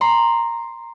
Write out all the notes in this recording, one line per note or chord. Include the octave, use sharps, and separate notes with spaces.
A#5 C6